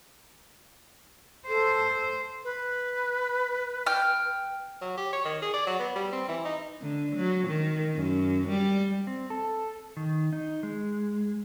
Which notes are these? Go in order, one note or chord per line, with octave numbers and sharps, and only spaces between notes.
A4 C5
B4
G5 F6
F#3
G4
C#5
D#3
G#4
D5
F#3
B3
G3
C4
E3
D#4
D3
F#3
D#3
F#2
G3
C4
A4
D#3
D#4
G#3